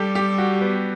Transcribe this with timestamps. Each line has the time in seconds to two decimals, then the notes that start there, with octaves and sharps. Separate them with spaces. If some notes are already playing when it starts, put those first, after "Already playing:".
Already playing: G3 G4 A4
0.15 G4
0.38 F#4
0.61 B3